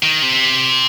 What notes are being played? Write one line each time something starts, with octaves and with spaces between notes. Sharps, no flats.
D#3
C3